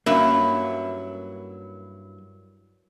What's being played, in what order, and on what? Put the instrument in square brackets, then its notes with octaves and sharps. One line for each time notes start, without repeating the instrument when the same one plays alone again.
[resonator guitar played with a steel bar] G2 F#3 [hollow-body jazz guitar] A#3 C#4 [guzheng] E4 [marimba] E5